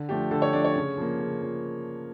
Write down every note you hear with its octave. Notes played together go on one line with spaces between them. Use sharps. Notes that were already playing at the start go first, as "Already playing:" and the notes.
Already playing: D3
F3 A3 D4 G4
D3 A4
C#5
F3 A3 D4 D5
C#5
C#3
F3 A#3
C#3
F3